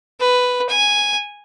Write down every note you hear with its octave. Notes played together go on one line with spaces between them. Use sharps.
B4
G#5